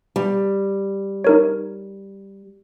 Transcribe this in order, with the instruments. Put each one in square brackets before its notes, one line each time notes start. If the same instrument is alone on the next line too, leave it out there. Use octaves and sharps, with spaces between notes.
[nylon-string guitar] G3
[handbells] D#4 A#4 C#5